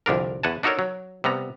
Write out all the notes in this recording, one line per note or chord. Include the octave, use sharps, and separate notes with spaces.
C2 F2 D3 D4 A#4
E2 F#5 G#5 A5
D4 D#4 F#4 A4 A#4 C#5
F#3
C3 G3 B3 A#5